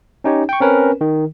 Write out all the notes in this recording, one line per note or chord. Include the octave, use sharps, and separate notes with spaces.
C#4 D#4 G4 C#5
G5 C#6
C4 C#4 A#4 B4 C#5
D#3